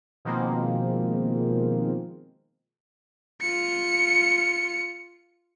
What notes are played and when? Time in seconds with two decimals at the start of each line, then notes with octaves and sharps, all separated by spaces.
0.25 B2 D#3 F3 G#3 A#3 C4
3.41 F4 C#7